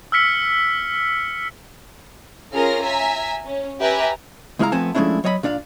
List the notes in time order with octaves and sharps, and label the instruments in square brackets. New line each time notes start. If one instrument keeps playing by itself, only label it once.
[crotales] E6 F6 B6 C#7
[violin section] C#4 F4 G#4 A#4 F6 A#6
E5 G#5 A#5 B6
C#4
G4 B4 E5 G#5 A#5
[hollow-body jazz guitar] C#2 G#3 E4 D5 F5 A#5
F3 A3 B3 C4 G#5 A5
F3 G#3 A3 C#4 D4 E4
F#3 C#5 D#5 E5 B5
A#2 D4 D5 F5